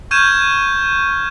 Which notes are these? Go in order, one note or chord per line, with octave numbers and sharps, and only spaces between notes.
C#6 F6 G6 G#6 D#7 E7